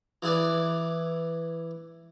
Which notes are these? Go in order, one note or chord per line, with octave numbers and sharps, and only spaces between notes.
E3 E4 G#4 B4 D5